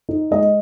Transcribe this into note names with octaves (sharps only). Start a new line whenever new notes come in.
D#4
G#3 D#5